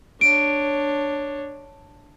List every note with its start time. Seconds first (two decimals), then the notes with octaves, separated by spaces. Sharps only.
0.21 D4 C#5 D7